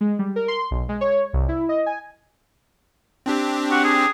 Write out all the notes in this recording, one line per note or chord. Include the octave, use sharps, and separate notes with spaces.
G#3
G3
A#4
C6
B1
G#3
C#5
C2
E4
D#5
G#5
C4 D4 G4
F#4
G#4